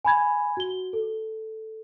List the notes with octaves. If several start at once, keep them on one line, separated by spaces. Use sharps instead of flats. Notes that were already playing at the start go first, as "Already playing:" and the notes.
G#5 B5 G#6
F#4 G7
A4